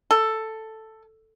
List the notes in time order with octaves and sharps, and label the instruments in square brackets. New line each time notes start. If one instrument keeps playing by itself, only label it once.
[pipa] A4